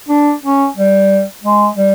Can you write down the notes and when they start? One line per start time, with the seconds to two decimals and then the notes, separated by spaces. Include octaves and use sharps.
0.09 D4
0.44 C#4
0.77 G3
1.44 G#3
1.77 G3